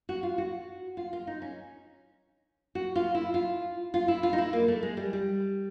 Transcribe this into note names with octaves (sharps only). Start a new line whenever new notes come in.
F#4
F4
F#4
F4
F4
D#4
C#4
F#4
F4
E4
F4
F4
E4
F4
D#4
E4
A#3
A3
G#3
G3
G3